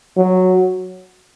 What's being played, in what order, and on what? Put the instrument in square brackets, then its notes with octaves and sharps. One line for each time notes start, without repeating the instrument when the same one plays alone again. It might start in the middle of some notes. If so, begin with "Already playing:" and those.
[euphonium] F#3